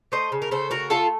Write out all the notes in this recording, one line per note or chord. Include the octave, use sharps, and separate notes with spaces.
A3 C5 D#5
C#3
A#4
C#3 A4 C5
A3 F#4 A#4
A3 F4 A4